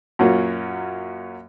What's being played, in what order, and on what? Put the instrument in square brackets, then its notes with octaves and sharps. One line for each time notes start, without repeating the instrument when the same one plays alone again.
[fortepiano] F#2 A#2 F#3 A#3 C#4 F4